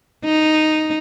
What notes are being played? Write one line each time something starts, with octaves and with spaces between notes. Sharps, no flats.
D#4